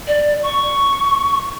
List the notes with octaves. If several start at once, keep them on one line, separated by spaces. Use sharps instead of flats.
D5
C#6